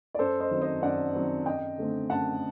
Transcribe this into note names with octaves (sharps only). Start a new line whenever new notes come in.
D5
F#2 A4 C5
C5 D#5
D#3 F#3 C4
C5 D#5
F#2 D5 F#5
D#3 F#3 C4
F#2 D#5 G5
D3 A3 C4
F#2 F#5 A5